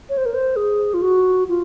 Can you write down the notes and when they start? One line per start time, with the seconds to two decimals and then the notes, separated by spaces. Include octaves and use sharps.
0.10 C#5
0.17 C5
0.26 A#4
0.34 C5
0.56 G#4
0.94 F4
1.02 F#4
1.49 F4